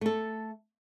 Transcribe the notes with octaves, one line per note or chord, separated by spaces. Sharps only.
A3 A4